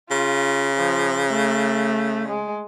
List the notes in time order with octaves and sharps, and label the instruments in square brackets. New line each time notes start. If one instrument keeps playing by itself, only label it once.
[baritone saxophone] C#3 [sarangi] F4
[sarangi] F3
A3
G#3